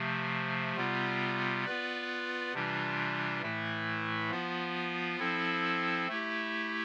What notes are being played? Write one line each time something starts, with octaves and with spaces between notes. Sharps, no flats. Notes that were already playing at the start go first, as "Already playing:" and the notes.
Already playing: C3 F3 A3
C3 G3 B3 F4
B3 F4 B4 D5
C3 E3 G3 D4 F4
A2 E3 A3 E4
F3 B3 F4
F3 C4 E4 A4
A3 E4 G4